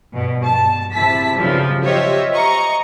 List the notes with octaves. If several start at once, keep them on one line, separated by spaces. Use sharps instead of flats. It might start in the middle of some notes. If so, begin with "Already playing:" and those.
G2 B2
A5
C3 E4 A5 B6
B1 C#3 F3 G3
F4 G4 C5 C#5 D#5 E5
D#5 A#5 C#6